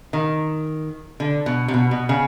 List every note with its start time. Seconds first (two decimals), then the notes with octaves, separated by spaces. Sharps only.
0.13 D#3
1.20 D3
1.46 B2
1.68 C3
1.74 B2
1.91 B2
2.09 C#3